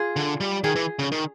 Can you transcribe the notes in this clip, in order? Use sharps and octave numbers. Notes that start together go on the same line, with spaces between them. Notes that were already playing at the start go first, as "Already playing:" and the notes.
Already playing: F4 G#4
D3
G3
D#3 G#4
E3
C#3
D#3